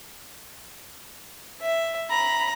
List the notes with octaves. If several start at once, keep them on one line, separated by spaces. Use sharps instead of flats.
E5
A#5 B5